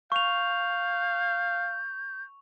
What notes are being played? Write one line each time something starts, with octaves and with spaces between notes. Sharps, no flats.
F5 C#6 G6 F7